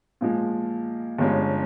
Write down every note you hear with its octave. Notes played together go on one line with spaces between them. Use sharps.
A#2 F3 G#3
G1 G2 F3 G#3 C#4